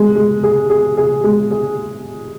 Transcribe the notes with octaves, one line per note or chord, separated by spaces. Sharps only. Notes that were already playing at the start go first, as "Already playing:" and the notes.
Already playing: G#3
G#3
G#4
G#4
G#4
G#3
G#4